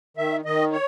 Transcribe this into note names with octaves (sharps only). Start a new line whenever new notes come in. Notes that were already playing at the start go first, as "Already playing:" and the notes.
D#3 E5
D#3 D#5
C#5